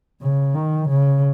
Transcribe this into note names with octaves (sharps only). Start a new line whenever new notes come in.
C#3
D#3
C#3